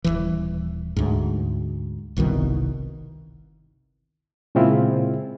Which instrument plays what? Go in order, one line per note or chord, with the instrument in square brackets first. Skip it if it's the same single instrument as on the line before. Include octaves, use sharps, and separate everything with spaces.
[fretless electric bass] D#1 G#1 E3
D2 G#2
G1 C2 B2 D#3
[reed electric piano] A#2 C#3 G#3 C4 E4 F4